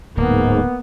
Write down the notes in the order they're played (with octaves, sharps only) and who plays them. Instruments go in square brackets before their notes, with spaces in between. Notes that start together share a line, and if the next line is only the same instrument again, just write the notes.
[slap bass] D1 [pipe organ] G#2 [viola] A#3 [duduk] B3